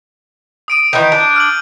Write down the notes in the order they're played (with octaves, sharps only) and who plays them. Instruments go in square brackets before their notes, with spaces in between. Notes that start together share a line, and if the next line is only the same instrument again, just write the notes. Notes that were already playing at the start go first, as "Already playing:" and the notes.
[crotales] D#6 D7 D#7
[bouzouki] D#3 E3 [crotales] G6
[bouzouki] D4
[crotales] F6 F#7